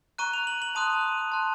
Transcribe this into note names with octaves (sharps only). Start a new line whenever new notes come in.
A#5 C#6 F#6 D#7
F7
F#7
F#7
A5 C6 D#6 F#6 D#7
A5 C6 F#6